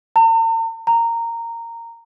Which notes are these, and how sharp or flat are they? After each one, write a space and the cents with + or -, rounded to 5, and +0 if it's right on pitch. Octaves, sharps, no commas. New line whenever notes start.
A#5 -45
A#5 -15